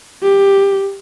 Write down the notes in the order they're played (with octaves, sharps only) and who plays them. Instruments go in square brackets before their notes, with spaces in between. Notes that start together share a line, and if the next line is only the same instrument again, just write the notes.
[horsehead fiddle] G4